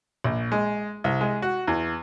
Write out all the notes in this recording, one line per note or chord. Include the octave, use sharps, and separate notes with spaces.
A#1
G#3
C2
G#3
F#4
E2